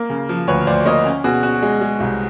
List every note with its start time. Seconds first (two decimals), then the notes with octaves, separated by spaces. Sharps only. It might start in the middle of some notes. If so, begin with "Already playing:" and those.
Already playing: A#3
0.10 C#3
0.29 F3
0.47 D2 B4 C#5
0.67 D2 C5 D5
0.86 A#3 C#5 D#5
1.05 C#4
1.24 B2 F#4 G#4
1.43 C#4 F#4
1.63 G#3
1.81 G#3
2.00 C2